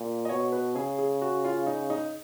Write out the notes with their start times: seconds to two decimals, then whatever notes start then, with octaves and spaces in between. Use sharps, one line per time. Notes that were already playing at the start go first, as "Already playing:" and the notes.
Already playing: A#2
0.25 D#5
0.29 B2 C#5
0.52 B4
0.75 C#3 G#4
0.99 G#4
1.22 F#4
1.45 F4
1.66 D#4
1.90 D#4